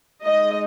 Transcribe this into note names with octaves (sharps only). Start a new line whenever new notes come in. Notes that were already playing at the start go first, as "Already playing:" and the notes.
G#3 D#4 D#5